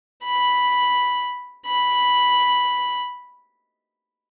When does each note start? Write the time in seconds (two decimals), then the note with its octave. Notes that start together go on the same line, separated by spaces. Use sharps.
0.24 B5
1.66 B5